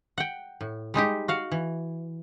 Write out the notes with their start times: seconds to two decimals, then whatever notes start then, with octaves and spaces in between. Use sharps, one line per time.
0.18 F#5 G5
0.61 A2
0.94 G3 G#3 D#4 G4
1.28 F#4 F5 F#5
1.52 E3